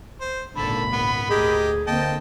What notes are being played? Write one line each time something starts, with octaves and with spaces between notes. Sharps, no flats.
C5
G#1 C#2 A#2 D3 A4 B5
B3
D2 G4 G#4 A#4 D#5
D3 A#3 C4 D#5 G5 A5